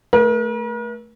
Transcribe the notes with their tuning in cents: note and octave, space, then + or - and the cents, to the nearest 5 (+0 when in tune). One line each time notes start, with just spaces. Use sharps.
A3 +0 A#4 +45